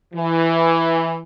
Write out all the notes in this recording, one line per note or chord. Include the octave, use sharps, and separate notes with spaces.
E3